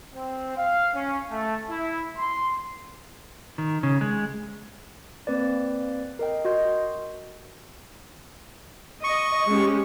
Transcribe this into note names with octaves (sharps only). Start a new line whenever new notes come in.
C4
F5
C#4
A3
E4
C6
D#3
C#3
G#3
A#3 C4 B4 D5
A#4 D#5 G5
F#4 A#4 D#5 C6 G6
D#5 C#6
G#3 C#4 G4